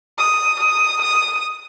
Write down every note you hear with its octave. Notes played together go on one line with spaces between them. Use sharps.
D#6
D#6
D#6